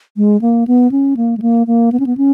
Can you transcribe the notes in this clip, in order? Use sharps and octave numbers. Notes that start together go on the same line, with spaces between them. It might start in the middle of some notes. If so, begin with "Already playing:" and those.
G#3
A#3
B3
C#4
A#3
G#3
A#3
A#3
B3
C#4
B3
C#4